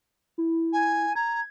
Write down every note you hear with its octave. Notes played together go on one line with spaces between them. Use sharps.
E4
G#5
A#5 G#6